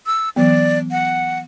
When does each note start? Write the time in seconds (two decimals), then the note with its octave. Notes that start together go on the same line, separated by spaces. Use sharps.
0.06 E6
0.36 E3 F#3 B3 D5
0.91 F#5